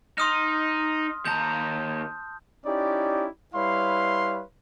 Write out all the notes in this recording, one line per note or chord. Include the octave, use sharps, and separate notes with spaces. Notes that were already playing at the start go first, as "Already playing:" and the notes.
D#4 C6 D#6 F6
D#2 A5 A#5 G6
C#4 D#4 E4 G4 D5
G3 E4 B4 C#5 F5 C6